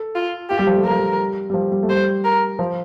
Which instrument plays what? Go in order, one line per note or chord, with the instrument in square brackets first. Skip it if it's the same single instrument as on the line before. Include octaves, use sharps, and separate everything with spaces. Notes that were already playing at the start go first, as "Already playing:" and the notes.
Already playing: [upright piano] A4
[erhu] F4
[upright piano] F4 [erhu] G4
[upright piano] G3
F3
A3
[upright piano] G3 [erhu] A#4
[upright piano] F3
G3
G3
F3
G3
A3
[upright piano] G3 [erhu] C5
[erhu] A#4
[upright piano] F3